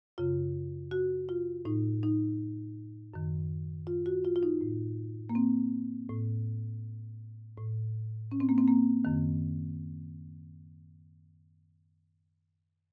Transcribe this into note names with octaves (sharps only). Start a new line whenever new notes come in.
F#2 C#3 F4
F#4
F4
A2 D#4
D#4
F#2 D#3
F4
F#4
F4
F4
D#4
A2
A#3
C4
A2
A2
C#4
C4
A#3
C4
A#3
F#2 D#3